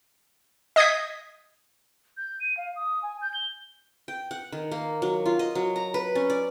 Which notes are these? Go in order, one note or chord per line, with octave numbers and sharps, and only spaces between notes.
D#5 D#6 G6 G#6 B6
G6
D#7
F5
D#6
G#5
G6
G7
G5
F#5
D#3
A#3
F#3
F4
D#5
F#3
A#5
B4
C#4
D5